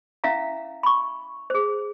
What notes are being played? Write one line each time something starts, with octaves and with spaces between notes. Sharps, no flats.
C#4 E4 E5 F5 A#5
B5 C#6
G#4 C5